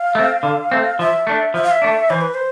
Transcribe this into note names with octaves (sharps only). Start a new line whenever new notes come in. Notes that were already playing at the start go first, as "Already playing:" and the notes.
Already playing: F5
A3 C4
D3
A3 C4
F3 E5
A3 D4
F3 E5
F5
E5
A3 D4
E3 C5
B4
C5